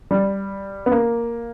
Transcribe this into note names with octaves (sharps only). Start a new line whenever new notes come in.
G3
B3
A#3